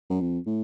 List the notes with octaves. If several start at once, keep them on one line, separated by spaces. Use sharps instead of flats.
F#2
F2
A2